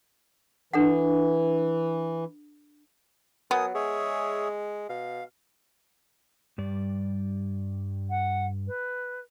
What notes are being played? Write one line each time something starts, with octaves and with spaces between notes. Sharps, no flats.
E3 D4 A4 F#5
F#3 B3 A#4 G#5 D#6
G#3 G#4 C#5 E5
B2 F5
G2 G3 D5
F#5
B4